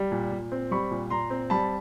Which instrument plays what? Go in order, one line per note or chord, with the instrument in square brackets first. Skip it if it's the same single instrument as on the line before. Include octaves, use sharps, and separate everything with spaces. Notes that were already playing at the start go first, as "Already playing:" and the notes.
Already playing: [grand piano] G3
A#2
A#2
C4
G3 B5 C#6
A#2
A#2 A#5 C6
C4
G3 A5 B5